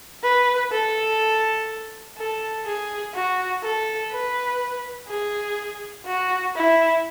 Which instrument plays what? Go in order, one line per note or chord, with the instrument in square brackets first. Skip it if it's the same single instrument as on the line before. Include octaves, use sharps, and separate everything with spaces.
[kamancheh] B4
A4
A4
G#4
F#4
A4
B4
G#4
F#4
E4